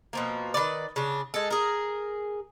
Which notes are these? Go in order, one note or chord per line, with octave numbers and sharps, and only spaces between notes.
B2 F3 A#3
D#3 E3 B4 D5
C#3 D4
G#3 A4
G#4 A#4